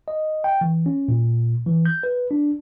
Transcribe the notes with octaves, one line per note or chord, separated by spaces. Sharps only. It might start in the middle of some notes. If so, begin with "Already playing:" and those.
D#5
G5
E3
C#4
A#2
E3
G6
B4
D4